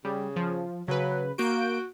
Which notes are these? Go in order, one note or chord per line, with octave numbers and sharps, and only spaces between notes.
C#3 G3
F3
C#3 F#3 B4
A#3 F#4 G6 D7